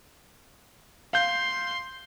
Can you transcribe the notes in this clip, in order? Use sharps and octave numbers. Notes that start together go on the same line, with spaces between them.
F5 C6 G6